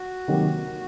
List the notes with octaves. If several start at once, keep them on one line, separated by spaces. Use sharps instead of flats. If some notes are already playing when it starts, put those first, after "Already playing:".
Already playing: F#4
C3 D#3 F#3 A#3